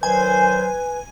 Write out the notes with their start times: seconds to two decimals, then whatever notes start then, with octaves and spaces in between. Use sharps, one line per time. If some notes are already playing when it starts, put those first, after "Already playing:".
0.03 D#3 F#3 B4 C5 G#5